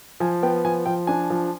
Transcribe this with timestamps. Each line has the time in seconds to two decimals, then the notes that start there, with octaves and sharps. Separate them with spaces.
0.20 F3 G#5
0.43 B3 G5
0.65 F3 G#5
0.86 F3 G5
1.07 D4 G#5
1.30 F3